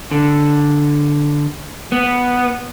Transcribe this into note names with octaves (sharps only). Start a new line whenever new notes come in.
D3
B3